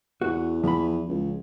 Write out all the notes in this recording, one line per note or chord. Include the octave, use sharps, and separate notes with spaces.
E2 F#4
E2 F3 B5
C#2